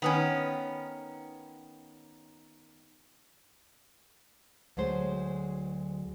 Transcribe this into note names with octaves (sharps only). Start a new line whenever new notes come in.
D#3 B3 C#4
D2 F#3 G#3 C5